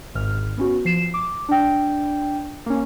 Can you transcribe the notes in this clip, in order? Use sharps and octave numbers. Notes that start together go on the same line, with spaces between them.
G#1 G#2 F6
B3 C#4 F#4
F3 C7 E7
D6
D4 G5
A#3 C#4